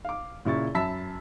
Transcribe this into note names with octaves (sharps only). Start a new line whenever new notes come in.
F5 D6
A#2 C#3 E4 C#6 A6
F#2 E5 A5 B5 E6 B6